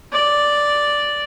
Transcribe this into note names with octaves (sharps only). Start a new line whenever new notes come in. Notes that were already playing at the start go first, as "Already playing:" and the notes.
D5